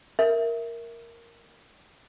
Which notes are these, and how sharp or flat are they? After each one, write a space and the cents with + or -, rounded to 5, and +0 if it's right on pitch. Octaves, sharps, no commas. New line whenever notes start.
A#4 +0 E5 +0